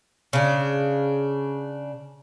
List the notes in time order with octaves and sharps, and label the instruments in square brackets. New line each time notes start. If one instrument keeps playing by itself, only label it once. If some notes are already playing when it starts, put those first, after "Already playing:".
[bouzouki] C#3 D4